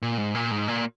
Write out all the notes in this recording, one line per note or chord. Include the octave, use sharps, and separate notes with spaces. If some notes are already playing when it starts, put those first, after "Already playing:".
A#2
G#2
A#2
G#2
A#2